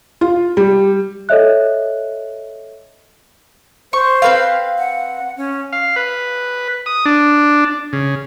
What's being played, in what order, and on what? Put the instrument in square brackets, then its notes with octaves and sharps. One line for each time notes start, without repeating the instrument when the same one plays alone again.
[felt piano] F4
G3
[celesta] A4 C#5 D#5 E5 F#6
[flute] C5 [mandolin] C#6
[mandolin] C4 B4 F5
[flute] F#5
C#4
[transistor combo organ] F5
B4
D#6
D4
C#3